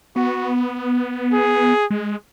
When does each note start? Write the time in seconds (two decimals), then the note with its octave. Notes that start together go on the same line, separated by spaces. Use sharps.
0.16 B3 F#4
1.33 G#4
1.90 G#3